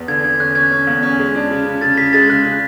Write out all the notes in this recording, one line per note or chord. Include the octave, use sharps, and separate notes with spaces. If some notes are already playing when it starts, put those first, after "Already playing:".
Already playing: E2 B3
D3 G#6
D3 G#6
C#4 F#6
C#4 G#6
C#4
E2
C#4
G#3
D4
C#3
C#3
C#3 A6
C#3 B6
G#3 A6
C#3 F#6
C#3